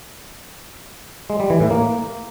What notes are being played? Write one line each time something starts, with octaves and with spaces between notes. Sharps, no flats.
G#3
G3
E3
A2
A#3